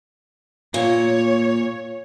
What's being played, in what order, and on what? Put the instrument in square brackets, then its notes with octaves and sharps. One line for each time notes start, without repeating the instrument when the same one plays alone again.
[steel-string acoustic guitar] A#2 [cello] C#5